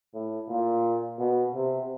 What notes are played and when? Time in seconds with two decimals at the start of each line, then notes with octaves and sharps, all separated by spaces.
0.14 A2
0.49 A#2
1.19 B2
1.55 C3